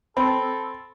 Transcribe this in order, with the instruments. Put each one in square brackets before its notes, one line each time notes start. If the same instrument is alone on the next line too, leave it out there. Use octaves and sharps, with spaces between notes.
[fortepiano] C4 [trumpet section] A4 [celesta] B5